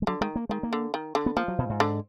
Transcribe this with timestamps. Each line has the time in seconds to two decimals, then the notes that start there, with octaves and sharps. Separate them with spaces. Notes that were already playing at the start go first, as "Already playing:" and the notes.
0.02 G#3
0.07 D3 F#3
0.21 D#3 G#3
0.36 A#3
0.49 D#3 G#3
0.63 A#3
0.73 D3
0.94 D#3
1.15 D3
1.26 B3
1.36 F3 A#3
1.48 F#3
1.58 B2
1.69 G#2
1.80 D3